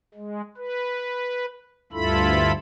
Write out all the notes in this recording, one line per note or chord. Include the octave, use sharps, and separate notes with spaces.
G#3
B4
D2 G2 E4 F4 A4 B5